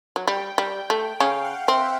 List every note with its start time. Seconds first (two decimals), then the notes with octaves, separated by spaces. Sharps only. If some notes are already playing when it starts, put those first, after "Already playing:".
0.16 F#3
0.27 G3 G5
0.58 G3
0.90 A3
1.20 C#3 C#4 F5
1.44 F#5
1.67 C4 E5